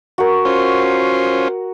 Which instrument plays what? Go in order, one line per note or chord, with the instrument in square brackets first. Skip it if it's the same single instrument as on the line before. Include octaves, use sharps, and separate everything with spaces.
[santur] F#4 A#4
[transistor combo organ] C#4 F4 C5